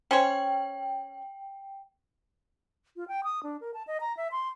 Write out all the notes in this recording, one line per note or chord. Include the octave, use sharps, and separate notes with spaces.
C#4 C5 C#5 G5
F4
G5
D#6
D4
A#4
A5
D#5
A#5
E5
C6